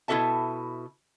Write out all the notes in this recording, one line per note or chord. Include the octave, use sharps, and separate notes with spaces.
B2 E4 F#4 A4 E5 A5